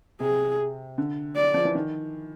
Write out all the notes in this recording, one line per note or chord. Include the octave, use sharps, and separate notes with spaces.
C3 G#4
D3
D5
F3
E3
D#3